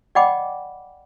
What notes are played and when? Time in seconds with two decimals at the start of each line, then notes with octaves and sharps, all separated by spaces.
0.15 D5 D#5 F#5 G5 B5 D6